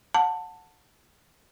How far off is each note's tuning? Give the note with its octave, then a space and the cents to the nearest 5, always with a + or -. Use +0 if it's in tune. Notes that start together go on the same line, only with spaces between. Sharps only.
F#5 -25 A5 +15